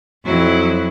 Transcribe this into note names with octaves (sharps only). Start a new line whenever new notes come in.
F2 F#3 E4